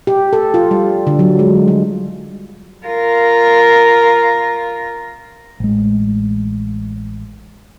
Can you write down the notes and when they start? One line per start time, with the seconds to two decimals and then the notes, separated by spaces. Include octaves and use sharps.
0.07 G4
0.33 A4
0.54 F4
0.71 G3
1.07 D3
1.19 F#3
1.39 G#3
1.68 G3
2.86 F4 A#4
5.60 A1 G#3